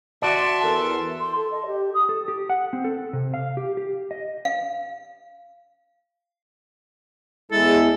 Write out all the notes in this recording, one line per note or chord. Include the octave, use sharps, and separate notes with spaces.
F#4 D5 E5 A5 C6
E2 A4 A#4
C6
A4
D#5
G4
D#6
A4
G4
F#5
C4
A4
C3
F5
G4
G4
D#5
F5
E2 G#3 E4 A4